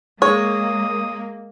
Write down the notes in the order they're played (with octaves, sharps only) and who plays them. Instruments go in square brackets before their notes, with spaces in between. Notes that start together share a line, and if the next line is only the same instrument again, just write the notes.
[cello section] G#3 A#3 [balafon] G#4 [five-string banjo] C#5 [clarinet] D#6